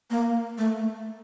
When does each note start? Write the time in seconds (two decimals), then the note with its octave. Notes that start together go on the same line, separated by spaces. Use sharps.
0.10 A#3
0.58 A3